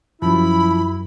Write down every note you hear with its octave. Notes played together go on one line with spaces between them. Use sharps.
F#2 F3 E4 B5